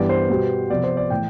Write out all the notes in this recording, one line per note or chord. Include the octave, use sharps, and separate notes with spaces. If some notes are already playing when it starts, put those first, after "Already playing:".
Already playing: G2 E3 G3 B3 D5
C5
B2 G3 B3
C3 F3 B3 D5
C5
D5
A2 E3 G5